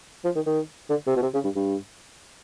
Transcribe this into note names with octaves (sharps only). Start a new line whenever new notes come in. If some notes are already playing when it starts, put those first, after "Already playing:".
F3
D#3
D#3
D3
C3
B2
C3
C#3
G2
G2